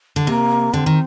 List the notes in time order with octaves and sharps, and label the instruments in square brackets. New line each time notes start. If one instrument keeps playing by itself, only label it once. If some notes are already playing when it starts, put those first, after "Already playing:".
[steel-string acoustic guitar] D3
[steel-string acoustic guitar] C3 [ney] A#3
[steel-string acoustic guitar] D3 [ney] C4
[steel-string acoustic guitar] D#3